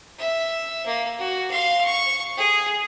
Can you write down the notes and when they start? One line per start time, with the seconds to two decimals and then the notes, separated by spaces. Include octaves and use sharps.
0.19 E5
0.86 A#3
1.19 F#4
1.51 F5 C6
1.85 C#6
2.37 G#4